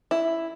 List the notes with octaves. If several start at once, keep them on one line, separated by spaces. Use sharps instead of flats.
E4